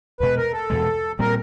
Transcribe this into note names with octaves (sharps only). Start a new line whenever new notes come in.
E2 B2 G#3 B4
A#4
A4
E2 B2 G#3
A#2 G3 C4 A#4